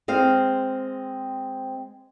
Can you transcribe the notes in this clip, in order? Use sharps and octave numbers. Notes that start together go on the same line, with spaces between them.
G#3 C4 F5